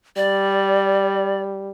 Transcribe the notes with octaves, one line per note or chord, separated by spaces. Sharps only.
G3 D5